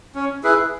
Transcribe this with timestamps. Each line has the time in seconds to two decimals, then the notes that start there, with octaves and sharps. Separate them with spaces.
0.15 C#4
0.44 E4 G#4 B4